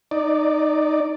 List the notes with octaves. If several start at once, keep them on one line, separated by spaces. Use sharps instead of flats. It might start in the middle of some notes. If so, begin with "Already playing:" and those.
D#4 D5